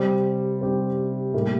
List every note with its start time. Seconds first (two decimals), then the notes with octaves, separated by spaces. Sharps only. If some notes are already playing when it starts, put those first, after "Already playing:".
Already playing: C3 G3 C4 G4 C5
0.61 G3 C4 G4 C5
1.34 A2 G3 A#3